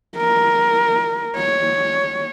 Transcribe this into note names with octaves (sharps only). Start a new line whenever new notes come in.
A#4
C#5